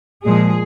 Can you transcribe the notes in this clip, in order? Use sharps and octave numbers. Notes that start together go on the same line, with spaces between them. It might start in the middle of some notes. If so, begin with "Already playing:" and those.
A#2 F3 G#3 G#4